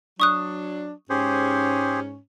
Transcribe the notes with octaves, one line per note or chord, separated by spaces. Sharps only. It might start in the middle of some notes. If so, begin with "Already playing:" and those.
F#3 D4 C#6 D#6 F#6
G#2 C#4 G4 G#4 C5